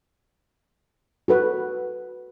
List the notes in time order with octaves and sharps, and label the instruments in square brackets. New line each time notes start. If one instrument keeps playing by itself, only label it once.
[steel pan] F#4 A4 B4